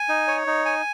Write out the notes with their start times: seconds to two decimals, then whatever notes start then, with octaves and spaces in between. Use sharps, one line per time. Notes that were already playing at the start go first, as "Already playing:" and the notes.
Already playing: G#5
0.09 D#4
0.27 C#5
0.47 D#4
0.65 G#5